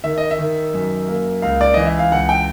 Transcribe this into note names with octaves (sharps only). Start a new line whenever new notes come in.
D#3 E5
D#5
E5
D#3
F#2
A#3
C#2 F5
D5
E3 D#5
E5
F5
C#2 F#5
G5